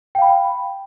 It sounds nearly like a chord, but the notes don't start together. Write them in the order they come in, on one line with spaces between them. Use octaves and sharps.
G5 F5 B5